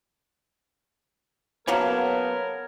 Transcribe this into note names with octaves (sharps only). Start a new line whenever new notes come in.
C#3 F#3 A#3 B3 A#4 C#5 A5